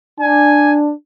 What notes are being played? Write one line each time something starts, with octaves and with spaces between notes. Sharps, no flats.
D4 G#5